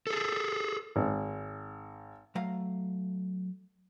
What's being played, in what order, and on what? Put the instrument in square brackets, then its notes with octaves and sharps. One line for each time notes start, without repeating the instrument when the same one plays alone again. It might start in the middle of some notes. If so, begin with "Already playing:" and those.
[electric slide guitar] G#4 A4
[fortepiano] G#1
[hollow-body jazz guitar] F#3 A3 F5 A#5